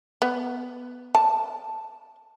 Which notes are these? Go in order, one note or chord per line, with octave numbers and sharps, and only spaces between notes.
B3
A5